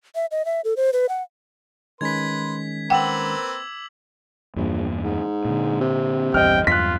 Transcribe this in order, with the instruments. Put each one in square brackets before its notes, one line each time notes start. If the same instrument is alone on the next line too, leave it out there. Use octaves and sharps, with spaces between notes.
[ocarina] E5
D#5
E5
A4
C5
B4
F#5
[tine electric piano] D#3 G#3 C#4 [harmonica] B4 C6 [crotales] G#6 B6
[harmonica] A#3 C4 B4 [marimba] F#5 G5 [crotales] D6 E6 F#7
[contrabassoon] A#1 [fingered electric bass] E2 G2 A#3
[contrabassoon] G#2
[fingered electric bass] A#2 D3
[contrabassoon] C3
[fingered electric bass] A#1 E2 G2 [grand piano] D#5 F6 [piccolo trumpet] G5
[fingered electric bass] E2 G2 F#3 [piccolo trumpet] F4 [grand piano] F#6 B6